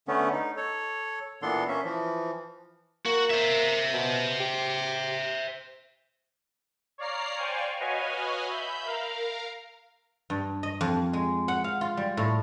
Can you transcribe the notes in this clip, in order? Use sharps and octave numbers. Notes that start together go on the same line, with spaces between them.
D3 A3 B3 C#4
D#4
A4 C#5
A#2 E3 B3 D4 A4 C6
A#3 C#4 E5
E3 F3
A#3 F#4
C5 E5
B2
G4
C#5 D5 F5 A#5 C7
C5 D5 F5 G5 G#5 C#6
F#4 B4 C#5 D#5 F5 G#5
E5 B5 G6
A#4 F5 A#5
G2
D#5
F2
G#3
F#5
F5
F4
G3
A2